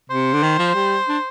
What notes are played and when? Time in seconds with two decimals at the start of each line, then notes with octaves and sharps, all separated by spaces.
0.10 C3 C5
0.33 D3
0.43 D#3
0.59 F3
0.74 G3
1.09 D4